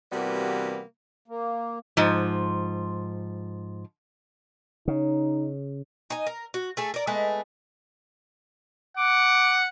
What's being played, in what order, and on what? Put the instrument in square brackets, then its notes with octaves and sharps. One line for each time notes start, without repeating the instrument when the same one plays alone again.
[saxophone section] C3 E3 G3 A#3 B3 F#4
[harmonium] A#3
[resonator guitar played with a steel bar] G#2 F3
[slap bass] C#3 [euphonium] D#4
[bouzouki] D#4 G#5
A#4
F#4
A3 G#4 A4
A#4 D5
G#3 A3 B3
[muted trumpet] F#5 [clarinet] D6